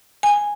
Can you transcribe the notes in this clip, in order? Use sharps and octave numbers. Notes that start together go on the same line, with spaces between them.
G#5